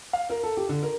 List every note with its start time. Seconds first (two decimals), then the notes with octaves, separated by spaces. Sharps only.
0.13 F5
0.30 A#4
0.43 A4
0.57 G4
0.69 D3
0.83 A#4